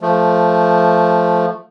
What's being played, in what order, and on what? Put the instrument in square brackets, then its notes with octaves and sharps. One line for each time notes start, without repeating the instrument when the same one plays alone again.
[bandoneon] F3 A3